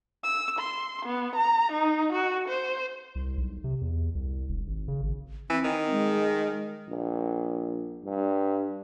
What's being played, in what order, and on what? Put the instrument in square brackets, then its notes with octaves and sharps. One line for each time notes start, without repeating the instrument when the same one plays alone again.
[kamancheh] E6
C6
B3
A#5
D#4
F#4
C5
[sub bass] C2
B1
C3
E2
C2
E1
G#1
C#3
G#1
[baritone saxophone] E3 [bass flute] C4
[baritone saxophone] D#3
[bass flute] G#3
[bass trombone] A#1
G2